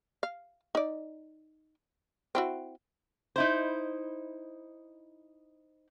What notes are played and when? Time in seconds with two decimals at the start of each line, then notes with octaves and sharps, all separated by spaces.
0.23 F5
0.75 D#4 D5
2.35 C4 E4 F#4
3.36 D#4 E4 C5